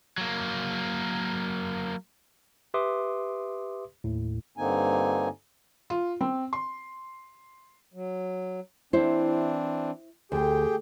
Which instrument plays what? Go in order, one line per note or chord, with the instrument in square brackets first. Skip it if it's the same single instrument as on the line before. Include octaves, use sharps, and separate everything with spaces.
[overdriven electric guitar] F#3 A#3
[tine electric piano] G4 B4 E5 C6 D6 D#6
D#2 A2
[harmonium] G2 D3 A#3 C4 D#4 G#5
[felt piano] F4
C4
C6
[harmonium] F#3
[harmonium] E3 C4 D4 [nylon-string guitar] E4 C5
[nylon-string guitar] D2 [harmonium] G4 G#4 G5